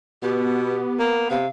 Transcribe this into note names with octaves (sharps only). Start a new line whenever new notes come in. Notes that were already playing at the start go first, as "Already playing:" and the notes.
B2 B3 G4
A#3
C3 F5